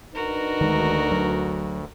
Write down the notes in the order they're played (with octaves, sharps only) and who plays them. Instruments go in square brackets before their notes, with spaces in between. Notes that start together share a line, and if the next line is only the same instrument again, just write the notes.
[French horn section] D4 D#4 B4 [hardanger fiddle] F#4 A#4
[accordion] D2 [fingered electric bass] D#3 G#3
[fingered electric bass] F#3